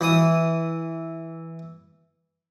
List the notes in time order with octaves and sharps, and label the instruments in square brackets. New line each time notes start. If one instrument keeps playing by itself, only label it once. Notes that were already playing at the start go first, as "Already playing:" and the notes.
[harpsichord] E3 D#6